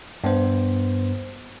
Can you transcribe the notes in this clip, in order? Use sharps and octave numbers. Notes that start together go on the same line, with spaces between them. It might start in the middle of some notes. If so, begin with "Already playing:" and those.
G2 B3 C5